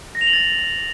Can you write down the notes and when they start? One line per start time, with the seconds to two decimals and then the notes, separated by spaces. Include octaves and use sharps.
0.15 A#6
0.21 F7
0.27 F#7
0.33 A6